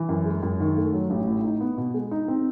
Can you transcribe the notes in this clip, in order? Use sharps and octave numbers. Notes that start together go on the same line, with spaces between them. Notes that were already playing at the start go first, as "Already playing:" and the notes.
Already playing: E3
F#2
G#3
F#2
D#3
A3
F#3
A1
A2
D#4
B3
B2
G#3
D#4
C4